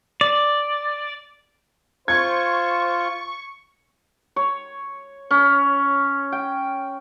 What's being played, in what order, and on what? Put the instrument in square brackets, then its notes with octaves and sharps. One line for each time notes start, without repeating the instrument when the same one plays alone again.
[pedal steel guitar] D5
[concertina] F4 [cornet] C5 [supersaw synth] C#6 [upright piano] G#6
[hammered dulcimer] C#5
C#4
G5